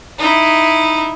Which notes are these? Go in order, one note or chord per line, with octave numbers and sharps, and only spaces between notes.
D#4 E4